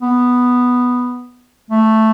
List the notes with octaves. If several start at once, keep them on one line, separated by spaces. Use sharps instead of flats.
B3
A3